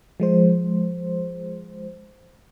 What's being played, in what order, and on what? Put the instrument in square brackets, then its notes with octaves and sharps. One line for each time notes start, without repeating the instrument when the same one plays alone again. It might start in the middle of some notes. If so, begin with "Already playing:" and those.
[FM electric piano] F3 G#3 C5